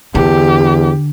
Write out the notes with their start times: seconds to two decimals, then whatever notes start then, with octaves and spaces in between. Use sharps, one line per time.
0.15 E2 D3 G4